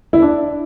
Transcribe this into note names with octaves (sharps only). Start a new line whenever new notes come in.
E4
D4